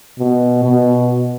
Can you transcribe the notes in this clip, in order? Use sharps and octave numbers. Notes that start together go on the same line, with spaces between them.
B2
B2